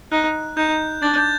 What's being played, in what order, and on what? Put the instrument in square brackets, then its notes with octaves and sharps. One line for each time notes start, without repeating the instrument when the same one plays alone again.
[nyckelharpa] D#4 [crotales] F#6
[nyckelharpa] D#4 [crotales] G6
[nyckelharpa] D4 [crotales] A6
[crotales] G6